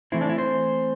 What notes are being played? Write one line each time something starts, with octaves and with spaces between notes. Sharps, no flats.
E3 A3 C4 E4
D4
E4
C5